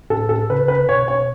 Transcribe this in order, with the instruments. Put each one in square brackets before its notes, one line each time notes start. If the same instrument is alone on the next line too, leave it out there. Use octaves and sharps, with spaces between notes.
[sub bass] A2 [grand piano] A4
[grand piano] A4
[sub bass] C#3 [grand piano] B4
[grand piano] B4
[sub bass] B2 [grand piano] C#5
[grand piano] C#5